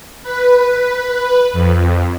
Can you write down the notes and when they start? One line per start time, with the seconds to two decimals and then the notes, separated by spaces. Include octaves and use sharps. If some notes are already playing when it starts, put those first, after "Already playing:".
0.23 B4
0.78 B4
1.53 F2